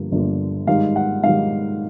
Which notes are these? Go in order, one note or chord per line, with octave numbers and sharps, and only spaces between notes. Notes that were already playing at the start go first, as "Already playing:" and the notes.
Already playing: G1 G2 D3 F3 A#3
G1 G2 D3 F3 A#3
G#2 D#3 G3 F5
F#5
G#2 D#3 G3 F5